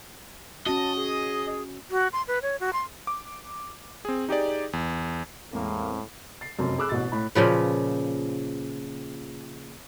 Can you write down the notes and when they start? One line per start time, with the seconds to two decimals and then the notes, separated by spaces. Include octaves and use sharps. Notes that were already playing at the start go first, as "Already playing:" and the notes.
0.66 C#4 F#4 D#5 A5
0.96 G#4
1.91 F#4
2.13 C6
2.28 B4
2.42 C#5
2.60 F#4
2.73 C6
3.07 D6
4.05 C4 G#4
4.29 D#4 G4 G#4 D5
4.73 E2
5.52 E2 A2 G#3 A#3 C4
6.41 A6 C7
6.59 F1 F#2
6.78 G#4 B5 D6 E6 F#6
6.89 A1 B2 A6
7.12 A2 B5
7.35 A#2 C#3 F3 B4